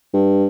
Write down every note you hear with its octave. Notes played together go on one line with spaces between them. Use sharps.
G2